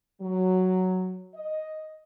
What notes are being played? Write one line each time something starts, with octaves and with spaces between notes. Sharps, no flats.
F#3
D#5